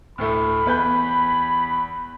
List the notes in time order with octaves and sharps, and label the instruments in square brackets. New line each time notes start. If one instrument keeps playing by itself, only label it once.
[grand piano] D2 A2 A3 [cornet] B5
[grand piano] E2 B4 G6